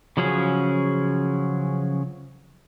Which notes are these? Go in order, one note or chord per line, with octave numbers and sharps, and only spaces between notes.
C#3 F3 F#3 C#4 G#4